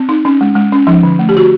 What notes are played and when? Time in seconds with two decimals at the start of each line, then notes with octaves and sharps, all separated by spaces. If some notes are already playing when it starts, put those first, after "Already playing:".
Already playing: C4
0.09 D#4
0.25 C#4
0.41 G#3
0.55 G#3
0.72 C#4
0.87 F3 D#4
1.03 D3
1.19 A3
1.29 G4
1.35 D3 F#4